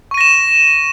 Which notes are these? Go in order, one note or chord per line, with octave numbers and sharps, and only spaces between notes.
C#6 A#6 D#7 E7